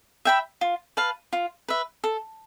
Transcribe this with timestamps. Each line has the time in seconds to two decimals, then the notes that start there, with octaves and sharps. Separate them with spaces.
0.25 E5 G5 B5
0.61 F4
0.97 B4 F5 A5
1.33 F4
1.68 B4 E5
2.04 A4